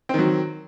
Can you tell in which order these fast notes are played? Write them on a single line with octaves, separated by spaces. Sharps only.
C4 D#3 F#3